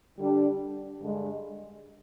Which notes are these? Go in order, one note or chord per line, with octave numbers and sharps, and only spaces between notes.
D3 G3 D4 G4
G2 D3 G#3